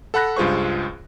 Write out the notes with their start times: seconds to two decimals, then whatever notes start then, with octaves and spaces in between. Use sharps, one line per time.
0.14 A4 F#5 B5 F#6 A#6
0.36 C#2 G2 F4 G#4 C5 C#6